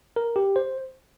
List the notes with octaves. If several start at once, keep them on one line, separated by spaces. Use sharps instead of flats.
A#4
G4
C5